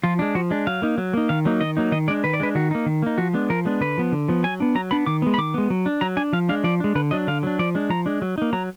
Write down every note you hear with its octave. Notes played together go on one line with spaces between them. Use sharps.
F3 F4
G#3 D4
F3 F#4
G#3 D4
F#3 F5
A#3 D#4
F#3
A#3 D#4
D#3 F5
F#3 A#3 D#4
D#3 D#5
F#3 A#3 D#4
D#3 D#5
G#3 D4 D5
D#3 B4
D5
G#3 D4 B4
D#3 F#4
A#3 D#4
D#3
A#3 D#4
F3 F#4
G#3 B3 D4
F3 A#4
G#3 B3 D4
D3 B4
F3 B3
D3
F3 B3
F#3 G#5
B3 D4
F#3 A#5
B3 D4 B5
D#3 D6
G#3 B3
B5
D#3 D6
G#3 B3
F#3
D4
F#3 A#5
D4 G#5
F3 F5
G#3 D4 F5
F3 D5
G#3 D4
D3 B4
F#3 D4 D#5
D3 F5
F#3 D4
F3 D5
G#3 D4
F3 A#5
G#3 D4
F#3
A#3 D#4
F#3 A#5